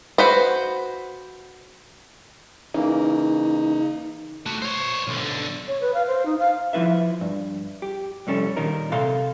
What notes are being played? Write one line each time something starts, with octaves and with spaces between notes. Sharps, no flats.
F#4 B4 C5
C#3 E3 A#3 D#4
A3 F#4
C5 C#5
B1 D3
C#5
B4
F5
C5
D#4
F5
F3 G#3 E4 B4 E5
G2
G4
C2 F2 G3 C#4 A4
A#2 D#3 G3 D#4 A#4
C3 A4 F5 C6